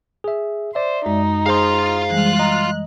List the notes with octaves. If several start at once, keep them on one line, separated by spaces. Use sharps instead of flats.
G#4 E5
C5 D5 E5
F#2 G#3 D#4
G#4 C5 F5 C6
E3 G3 G#3 F#6
D#5 A#5